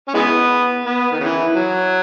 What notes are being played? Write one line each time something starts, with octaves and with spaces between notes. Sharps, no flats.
C#4
E3 G#3 B3
B3
D#3
C#3 E3
F#3